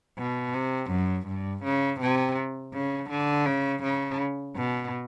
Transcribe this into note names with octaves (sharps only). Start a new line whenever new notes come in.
B2
C3
F#2
G2
C#3
C3
C#3
D3
C#3
C#3
B2